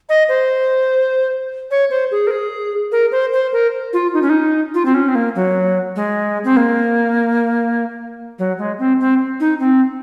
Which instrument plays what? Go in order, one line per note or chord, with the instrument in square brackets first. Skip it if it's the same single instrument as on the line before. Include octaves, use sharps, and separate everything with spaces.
[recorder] D#5
C5
C#5
C5
G#4
A#4
G#4
A#4
C5
C5
A#4
F4
D#4
C#4
D#4
F4
C4
C#4
C4
A#3
F#3
G#3
C4
A#3
F#3
G#3
C4
C4
D#4
C4